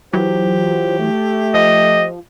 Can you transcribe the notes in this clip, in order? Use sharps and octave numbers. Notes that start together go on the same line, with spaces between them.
E3 F#3 F4 G4 C5
A3
F3 D#5